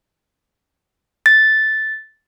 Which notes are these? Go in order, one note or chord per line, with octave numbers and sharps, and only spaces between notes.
A6